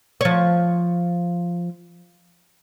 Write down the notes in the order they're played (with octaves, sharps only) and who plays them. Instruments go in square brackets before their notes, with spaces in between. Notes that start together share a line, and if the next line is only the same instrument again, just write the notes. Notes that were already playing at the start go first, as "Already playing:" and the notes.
[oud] F3 C#5